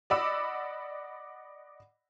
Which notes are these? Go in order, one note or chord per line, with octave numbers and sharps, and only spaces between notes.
D5 D#5 F#5 B5 D6 E6